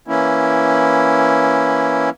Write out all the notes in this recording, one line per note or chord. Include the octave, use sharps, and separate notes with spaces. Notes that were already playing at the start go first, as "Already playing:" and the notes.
E3 A#3 C#4 E4